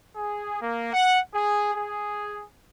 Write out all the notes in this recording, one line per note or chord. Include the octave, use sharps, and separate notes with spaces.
G#4
A#3
F#5
G#4
G#4